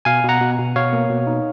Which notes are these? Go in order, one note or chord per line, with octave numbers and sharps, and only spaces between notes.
B2 F5 G#5
B2
F#5 A#5
B2
B2
B2 C#5 F5
A#3
B2
D#4